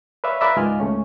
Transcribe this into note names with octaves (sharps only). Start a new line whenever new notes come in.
B4 C#5 D5 E5 F5
A#4 B4 D5 E5 B5
C#2 G#2 F4 D#5 G#5 F6
C#2 A3 C#4